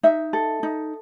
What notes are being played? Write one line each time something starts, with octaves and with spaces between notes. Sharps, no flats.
D#4 E5
A4
D#4